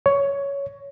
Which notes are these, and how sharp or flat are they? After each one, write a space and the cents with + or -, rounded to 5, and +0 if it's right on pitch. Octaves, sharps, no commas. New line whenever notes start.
C#5 +10